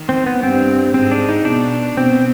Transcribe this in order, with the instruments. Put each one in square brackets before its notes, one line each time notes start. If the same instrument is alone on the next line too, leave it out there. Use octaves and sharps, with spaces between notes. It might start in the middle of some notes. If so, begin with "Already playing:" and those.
Already playing: [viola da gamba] D#3
[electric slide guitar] C4
B3
[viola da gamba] G2 G3 [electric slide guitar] C4
[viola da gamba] G#2 G#3 [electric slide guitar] C4
[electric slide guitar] D4
D#4
[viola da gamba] B2 B3 [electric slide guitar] D4
[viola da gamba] B2 B3 [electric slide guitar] C4